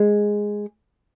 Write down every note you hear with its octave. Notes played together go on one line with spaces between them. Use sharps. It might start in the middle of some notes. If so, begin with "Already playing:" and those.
Already playing: G#3